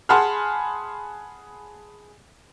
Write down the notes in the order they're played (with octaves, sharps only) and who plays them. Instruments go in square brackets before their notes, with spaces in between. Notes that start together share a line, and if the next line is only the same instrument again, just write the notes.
[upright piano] G#4 F#5 A5 B5 C6 F6